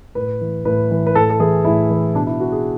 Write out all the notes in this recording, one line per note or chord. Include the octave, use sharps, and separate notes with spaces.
A2 B4
E3
A2 B4
E3
B4
A2 A4
A4
E3 G#4
A2 E4
E3
B2 D4
E4
F#4
G#4